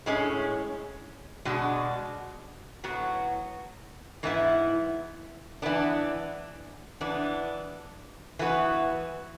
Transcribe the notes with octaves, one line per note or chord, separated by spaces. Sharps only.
A2 G#3 C#4
B2 G#3 D4 F#4
A2 F#3 B3 F#4
G#2 E3 B3 E4
E3 B3 D4
E3 B3 D4
E3 B3 F#4